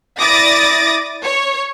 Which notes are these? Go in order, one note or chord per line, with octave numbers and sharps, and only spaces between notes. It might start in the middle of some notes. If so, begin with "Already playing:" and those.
E4 D5 D6 D#6 A6 A#6
C#5